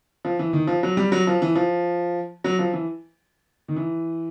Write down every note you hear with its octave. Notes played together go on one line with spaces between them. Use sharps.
F3
E3
D#3
F3
F#3
G3
F#3
F3
E3
F3
F#3
F3
E3
D#3
E3